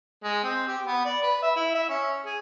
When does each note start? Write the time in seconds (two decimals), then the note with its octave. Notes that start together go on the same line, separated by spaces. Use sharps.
0.24 G#3
0.43 C4
0.68 G4
0.86 B3
1.05 D5
1.23 B4
1.43 E5
1.56 E4
1.75 E5
1.89 C#4
2.26 G#4